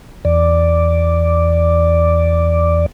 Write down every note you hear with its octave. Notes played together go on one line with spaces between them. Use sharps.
E2 D5